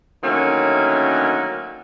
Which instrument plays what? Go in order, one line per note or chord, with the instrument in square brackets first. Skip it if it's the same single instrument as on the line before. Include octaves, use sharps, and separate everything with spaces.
[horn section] D3 D#3 F#3 A3 A#3 C#4